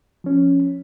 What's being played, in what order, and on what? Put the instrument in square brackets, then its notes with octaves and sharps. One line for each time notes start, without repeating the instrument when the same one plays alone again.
[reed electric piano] F3 C#4